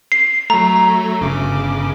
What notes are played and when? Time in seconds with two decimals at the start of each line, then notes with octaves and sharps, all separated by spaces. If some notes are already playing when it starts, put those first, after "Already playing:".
0.12 C7
0.50 F#3 A3 A#5
1.21 G1 C#3 D6